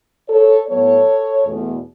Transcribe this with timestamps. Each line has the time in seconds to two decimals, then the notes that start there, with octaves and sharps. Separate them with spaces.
0.29 A4 C#5
0.67 A2 F#3 B3 A4 C#5
1.45 E2 B2 A3